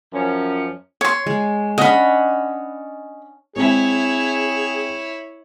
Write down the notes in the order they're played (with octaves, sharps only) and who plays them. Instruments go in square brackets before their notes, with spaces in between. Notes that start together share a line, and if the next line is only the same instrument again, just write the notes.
[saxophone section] F#2 F3 C#4
[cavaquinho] C#5 C6
[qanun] G#3
[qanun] C#4 D4 F#5 [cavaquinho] D#5 B5
[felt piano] G#3 C4 [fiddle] E4 C#5 [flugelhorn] G#4